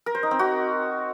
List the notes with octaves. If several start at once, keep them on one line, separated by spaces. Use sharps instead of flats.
A#4
C5
D#4
C4
F#4